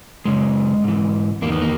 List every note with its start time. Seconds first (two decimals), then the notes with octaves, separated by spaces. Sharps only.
0.25 F#2 C#3 G#3
0.84 G#2 E3
1.42 E2 D#3 A#3
1.52 B3
1.62 A#3